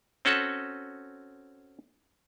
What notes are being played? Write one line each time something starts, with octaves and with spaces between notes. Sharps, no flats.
C4 C#4 F#4 A4